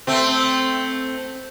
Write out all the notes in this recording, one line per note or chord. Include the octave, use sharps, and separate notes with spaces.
A3 C4